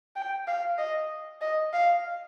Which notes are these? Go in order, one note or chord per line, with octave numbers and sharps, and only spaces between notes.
G5
F5
D#5
D#5
F5